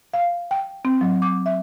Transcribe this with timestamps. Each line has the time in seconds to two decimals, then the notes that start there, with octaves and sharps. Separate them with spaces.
0.14 F5
0.51 G5
0.85 C4
1.01 F#3
1.22 D6
1.46 E5